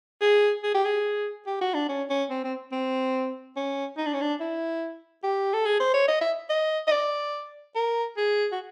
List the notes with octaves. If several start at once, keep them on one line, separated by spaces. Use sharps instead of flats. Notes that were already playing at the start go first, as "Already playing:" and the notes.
G#4
G#4
G4
G#4
G4
F#4
D4
C#4
C#4
C4
C4
C4
C#4
D#4
D4
C#4
D4
E4
G4
A4
G#4
C5
C#5
D#5
E5
D#5
D#5
D5
A#4
G#4
F#4